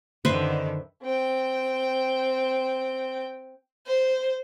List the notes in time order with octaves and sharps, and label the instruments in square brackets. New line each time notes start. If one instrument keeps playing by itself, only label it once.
[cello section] F#2 D3 D#3 [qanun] B4 C5 E5
[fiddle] C4 G5
[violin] C5